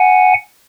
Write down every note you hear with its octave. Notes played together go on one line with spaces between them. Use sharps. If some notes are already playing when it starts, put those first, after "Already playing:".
Already playing: F#5 G#5